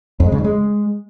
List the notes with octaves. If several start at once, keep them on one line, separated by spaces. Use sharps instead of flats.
F2
G#3
C#3
G2
G#3